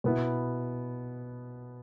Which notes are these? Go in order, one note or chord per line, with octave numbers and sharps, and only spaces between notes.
B2 B3 E4